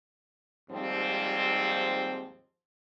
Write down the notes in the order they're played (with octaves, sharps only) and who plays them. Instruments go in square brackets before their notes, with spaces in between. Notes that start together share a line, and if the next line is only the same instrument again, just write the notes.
[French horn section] D#2 G#2 F3 G3 C4